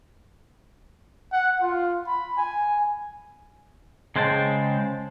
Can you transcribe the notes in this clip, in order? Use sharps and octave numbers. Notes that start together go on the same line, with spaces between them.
F#5
F4
B5
G#5
C#3 G#3 C5 G5 A5